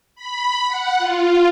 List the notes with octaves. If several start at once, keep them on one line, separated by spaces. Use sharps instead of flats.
B5
F#5
F4